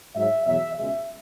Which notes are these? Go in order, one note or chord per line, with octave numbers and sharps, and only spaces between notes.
G#2 F#3 E5
E2 B2 F#3 E5
C#2 B2 G#3 E5